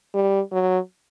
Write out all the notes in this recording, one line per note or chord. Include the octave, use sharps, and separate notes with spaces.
G3
F#3